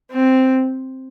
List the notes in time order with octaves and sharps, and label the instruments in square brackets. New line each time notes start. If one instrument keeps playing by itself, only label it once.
[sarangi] C4